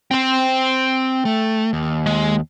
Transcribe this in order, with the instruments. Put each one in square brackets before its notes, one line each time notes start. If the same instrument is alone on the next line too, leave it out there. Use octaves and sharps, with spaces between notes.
[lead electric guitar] C4 C5 [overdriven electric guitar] G5 C6
[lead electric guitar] A3
D#2
[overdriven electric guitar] G#3